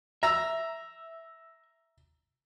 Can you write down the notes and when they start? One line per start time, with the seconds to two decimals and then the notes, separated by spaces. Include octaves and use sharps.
0.23 E5 A#5 E6